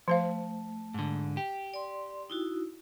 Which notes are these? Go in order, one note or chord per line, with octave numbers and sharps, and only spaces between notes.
F3 A3 C5 F5
G#2 D3
G4
D5 C6
D#4 E4 F#4